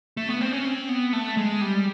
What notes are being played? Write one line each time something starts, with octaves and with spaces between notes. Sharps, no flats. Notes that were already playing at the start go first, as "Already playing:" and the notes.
A3
B3
C4
C#4
C4
B3
A3
G#3
G3